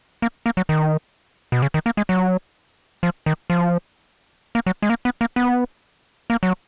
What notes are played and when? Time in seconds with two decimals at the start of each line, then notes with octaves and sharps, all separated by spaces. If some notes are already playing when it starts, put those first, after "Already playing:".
0.22 A#3
0.46 A#3
0.57 F#3
0.69 D#3
1.52 B2
1.62 C#3
1.74 D#3
1.86 A#3
1.97 G#3
2.09 F#3
3.03 F3
3.26 D#3
3.50 F3
4.55 A#3
4.66 F#3
4.82 G#3
4.90 A#3
5.05 B3
5.21 A#3
5.36 B3
6.30 A#3
6.43 F#3